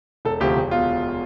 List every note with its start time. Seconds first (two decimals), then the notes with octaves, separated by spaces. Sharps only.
0.25 E1 A4
0.40 D2 C3 F3 G4
0.56 E1
0.71 B2 F4